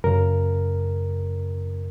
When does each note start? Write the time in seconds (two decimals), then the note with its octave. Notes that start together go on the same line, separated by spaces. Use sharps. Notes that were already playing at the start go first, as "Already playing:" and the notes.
0.04 F#2 C#3 A#4